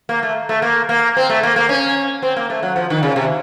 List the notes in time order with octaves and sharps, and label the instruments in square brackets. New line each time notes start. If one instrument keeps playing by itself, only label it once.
[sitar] A#3
A3
A3
A#3
A#3
C4
A3
A#3
A#3
C#4
C4
A#3
A3
F#3
F3
D#3
C#3
C3